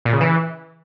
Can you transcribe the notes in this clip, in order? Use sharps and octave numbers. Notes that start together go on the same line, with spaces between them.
A#2
C#3
E3